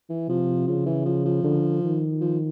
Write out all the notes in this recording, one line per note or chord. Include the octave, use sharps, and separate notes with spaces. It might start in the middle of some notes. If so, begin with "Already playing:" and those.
E3
C3 F3
C#3 F3
E3
F3
F3
D3
D#3
F3